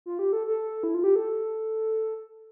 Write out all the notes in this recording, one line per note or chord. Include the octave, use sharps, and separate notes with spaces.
F4
G4
A4
A4
E4
F4
G4
A4